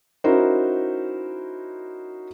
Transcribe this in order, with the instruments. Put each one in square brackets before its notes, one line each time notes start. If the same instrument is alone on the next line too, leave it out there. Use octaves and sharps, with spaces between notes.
[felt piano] C#4 D#4 E4 F#4 A#4 C5